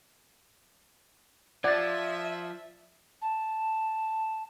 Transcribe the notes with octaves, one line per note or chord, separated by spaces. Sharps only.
F3 D5 E5 F#5 G#6 A6
A5